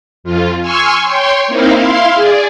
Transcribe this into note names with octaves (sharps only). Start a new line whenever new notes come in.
F2 F4
G#5 C6 C#6 E6 F6
C#5 G5 C6
A#3 C4 D#4 E4 F5
E4 F5 C6
G#4 D5